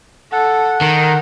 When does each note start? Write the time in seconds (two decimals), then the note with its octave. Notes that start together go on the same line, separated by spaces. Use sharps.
0.32 A4 F#5
0.81 D#3 A#4